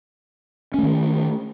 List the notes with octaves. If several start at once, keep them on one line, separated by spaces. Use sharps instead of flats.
D#3 A3 C#4